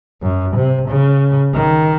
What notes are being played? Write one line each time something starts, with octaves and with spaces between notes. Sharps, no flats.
F#2
C3
C#3
D#3